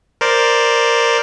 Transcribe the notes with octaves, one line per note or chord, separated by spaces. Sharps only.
A#4 C5 D5